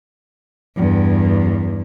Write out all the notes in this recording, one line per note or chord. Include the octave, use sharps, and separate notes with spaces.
E2 G2